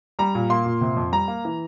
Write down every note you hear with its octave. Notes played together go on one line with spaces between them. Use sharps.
G3 A#5
A#2
A#3 C6
A#2
C3
F2
G3 A#5
A#3
E3